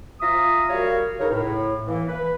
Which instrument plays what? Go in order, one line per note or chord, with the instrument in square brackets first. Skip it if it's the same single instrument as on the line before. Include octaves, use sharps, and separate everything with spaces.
[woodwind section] F4 E5 A#5 D#6
G3 F#4 A#4 C#5 F5
C#2 C#3 D#4 A#4 C#5
A2
E3 A#3
B4